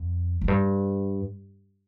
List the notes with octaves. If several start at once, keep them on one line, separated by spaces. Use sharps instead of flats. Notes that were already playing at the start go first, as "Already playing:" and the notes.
Already playing: F2
F2
G2